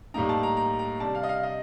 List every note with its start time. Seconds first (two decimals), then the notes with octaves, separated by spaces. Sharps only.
0.14 A2 G3 A#3 D#4 A#5
0.29 A5
0.43 A#5
0.57 A#5
0.79 A#5
1.00 C3 G3 D4 A5
1.15 F5
1.23 D#5
1.29 F5
1.43 D#5